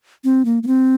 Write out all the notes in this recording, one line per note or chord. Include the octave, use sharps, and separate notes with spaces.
C4
A#3
A#3
C4